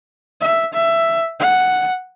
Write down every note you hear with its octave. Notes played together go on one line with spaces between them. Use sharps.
E5
E5
F#5